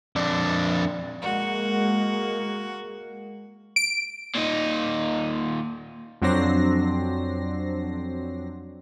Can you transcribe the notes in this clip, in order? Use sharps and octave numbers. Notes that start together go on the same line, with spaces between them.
F2 D4
G#3 A#3 F#4
D7
A#2 D#4
F2 F#3 C4 D4 A#6 C7